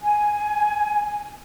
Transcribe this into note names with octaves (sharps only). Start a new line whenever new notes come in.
G#5